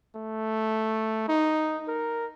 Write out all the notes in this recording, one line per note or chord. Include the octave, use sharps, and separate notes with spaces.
A3
D#4
A#4